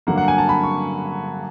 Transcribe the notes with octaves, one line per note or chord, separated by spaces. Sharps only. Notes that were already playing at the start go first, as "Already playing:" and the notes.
G2 D3 F#3 A#3 F#5
F#5
G#5
A5
B5
C#6